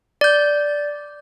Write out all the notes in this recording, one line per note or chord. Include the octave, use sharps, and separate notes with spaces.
D5 G6